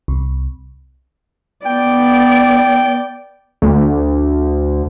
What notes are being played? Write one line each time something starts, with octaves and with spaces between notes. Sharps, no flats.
C2
B3 D5 G5
D2